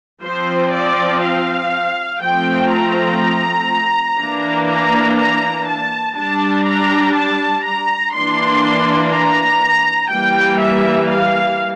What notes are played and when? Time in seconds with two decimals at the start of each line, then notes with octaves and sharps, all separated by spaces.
0.24 F3 C4 C5
0.74 D5
1.23 F5
2.22 F3 A3 C4 G5
2.71 A#5
4.19 E3 A#3 D4
4.68 A#5
5.18 A#5
5.67 A5
6.17 G3 D4 A5
6.65 A#5
7.15 A5
7.65 A#5
8.14 E3 A#3 D4 C6
9.13 A#5
10.12 E3 G3 A#3 G5
10.61 E5
11.10 F5